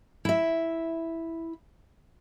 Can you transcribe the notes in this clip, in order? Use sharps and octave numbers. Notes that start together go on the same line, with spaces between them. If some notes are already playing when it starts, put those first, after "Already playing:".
E4 E5